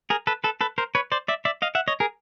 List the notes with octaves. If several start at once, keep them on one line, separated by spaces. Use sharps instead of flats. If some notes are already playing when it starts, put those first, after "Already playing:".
G#4 A#4
A4 B4
A4 B4
A4 B4
A#4 C5
B4 C#5
C5 D5
D5 E5
D5 E5
D#5 F5
E5 F#5
C#5 D#5
G#4 A#4